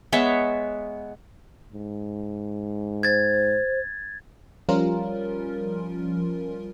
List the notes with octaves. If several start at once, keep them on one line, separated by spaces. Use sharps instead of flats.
G#3 B3 C#5 E5
G#2
C5 G#6 A6
F3 G3 C#4 F4 A#4